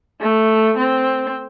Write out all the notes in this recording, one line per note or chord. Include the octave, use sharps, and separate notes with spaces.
A3
C4